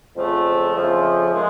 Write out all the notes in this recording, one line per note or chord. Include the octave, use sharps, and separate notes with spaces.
F2 C#3 F3 A3
F2 C#3 F3 A3
D#3 G#3